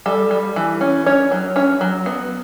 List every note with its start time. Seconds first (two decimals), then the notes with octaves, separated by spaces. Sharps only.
0.06 G3 A4
0.31 G3
0.56 E3
0.81 C#4
1.06 C#4 C#5
1.31 F#3
1.56 C#4 C#5
1.81 F#3
2.06 B3